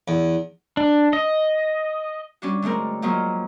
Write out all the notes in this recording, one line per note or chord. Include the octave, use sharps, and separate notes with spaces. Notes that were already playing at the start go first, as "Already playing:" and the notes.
E2
D4
D#5
G3 C#4 D4 F#4
D3 G#3 A3 C4 A#4
F3 F#3 G#3 A#3 D#4 F4